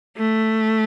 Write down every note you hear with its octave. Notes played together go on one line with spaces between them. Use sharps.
A3